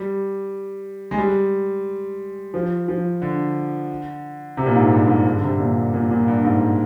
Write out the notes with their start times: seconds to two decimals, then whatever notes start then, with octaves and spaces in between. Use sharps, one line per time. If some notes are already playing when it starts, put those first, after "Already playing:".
Already playing: G3
1.11 G#3
1.18 G3
2.54 F3
2.88 F3
3.22 D3
4.57 C3
4.66 A#2
4.75 G#2
4.92 G2
5.08 G#2
5.26 G2
5.35 D3
5.43 C3
5.60 A#2
5.94 A#2
6.10 A#2
6.28 G2
6.44 G#2